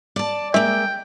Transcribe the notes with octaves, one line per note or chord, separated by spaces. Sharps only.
D5 A5
G#3 A#3 E5 G5